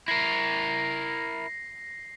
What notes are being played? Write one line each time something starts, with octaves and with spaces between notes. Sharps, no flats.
E4 A#4 A#6 C7